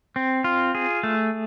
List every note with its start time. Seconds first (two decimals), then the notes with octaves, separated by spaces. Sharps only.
0.16 C4
0.44 F4
0.75 G#4
1.03 A3